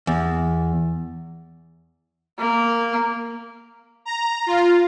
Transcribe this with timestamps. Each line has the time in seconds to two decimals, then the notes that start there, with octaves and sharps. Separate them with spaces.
0.07 E2
2.39 A#3
4.05 A#5
4.46 F4